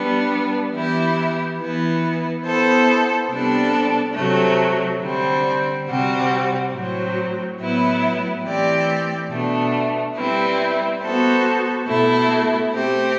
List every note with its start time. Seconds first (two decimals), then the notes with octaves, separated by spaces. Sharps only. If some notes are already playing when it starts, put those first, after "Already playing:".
Already playing: G3 B3 D4
0.73 E3 B3 E4 G4
1.59 E3 B3 E4
2.44 B3 E4 A4 C5
3.30 C3 G3 B3 D4 A4
4.15 C3 F#3 A3
5.01 D3 G3 C4
5.87 C3 G3 C4 F#4
6.73 A2 F#3 C4
7.59 A2 F#3 B3 E4 B4
8.44 E3 A3 C4 G4 D5
9.30 B2 A3 D4
10.16 G3 C4 E4 B4
11.01 B3 F#4 A4 C5
11.87 B2 A3 E4 A4
12.73 A3 C4 G4